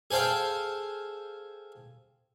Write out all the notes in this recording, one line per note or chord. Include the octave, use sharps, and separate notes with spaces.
G#4 A4 C5 F5 G5